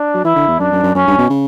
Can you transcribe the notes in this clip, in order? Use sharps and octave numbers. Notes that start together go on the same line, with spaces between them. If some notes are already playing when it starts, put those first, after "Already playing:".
Already playing: D4
F#3
E3 E4
D3
E2
F#2 D4
F#2
F#2
F#2 C#4
G2
B2
C#3